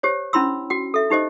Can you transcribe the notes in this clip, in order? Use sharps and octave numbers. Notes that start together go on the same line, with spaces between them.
G4 C5 C#5
C#4 D4 E4 B5 C6 E6
F#4 G5
A4 E5
D#4 G4 C5 D#5